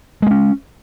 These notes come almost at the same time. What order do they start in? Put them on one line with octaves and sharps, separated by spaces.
G#3 A#3 C#4